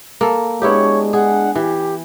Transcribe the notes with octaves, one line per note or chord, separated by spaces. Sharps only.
A#3 A4
G#3 B3 D4 E4 G4 C#5
G#4 F#5
E3 G4